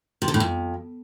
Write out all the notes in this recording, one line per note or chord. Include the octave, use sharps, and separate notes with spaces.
C3
D3
A2
F2